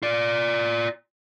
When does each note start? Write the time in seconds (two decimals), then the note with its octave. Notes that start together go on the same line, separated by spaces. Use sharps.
0.03 F4 D5